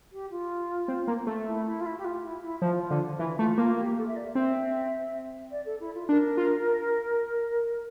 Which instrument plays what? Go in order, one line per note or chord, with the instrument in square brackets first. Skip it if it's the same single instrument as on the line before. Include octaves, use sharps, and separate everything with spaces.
[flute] G4
F4
[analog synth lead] C4
A#3
A3
[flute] E4
E4
F4
E4
G4
F4
E4
E4
[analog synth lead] F3 [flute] F4
[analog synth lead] D3
[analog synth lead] E3 [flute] E4
[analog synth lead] A3 [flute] F4
[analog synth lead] A#3 [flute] F4
[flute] G4
A4
E5
D5
[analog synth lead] C4 [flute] E5
[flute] D5
A4
E4
F4
[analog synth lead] D4 [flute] A#4
[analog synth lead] F4